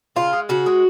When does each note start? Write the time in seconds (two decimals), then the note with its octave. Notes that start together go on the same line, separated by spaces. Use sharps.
0.16 C#3 F4
0.33 G#3
0.49 C#3 F#4
0.66 G#3